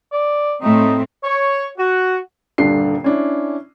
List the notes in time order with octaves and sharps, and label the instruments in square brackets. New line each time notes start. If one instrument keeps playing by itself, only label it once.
[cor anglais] D5
[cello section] A2 A3 C4 [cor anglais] D#4
[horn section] C#5
F#4
[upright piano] D#1 G2 D3 D4 C7
C#4 D4 E4